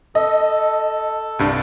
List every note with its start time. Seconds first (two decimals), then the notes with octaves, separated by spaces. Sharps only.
0.15 A4 D#5
1.39 C2 G2 D4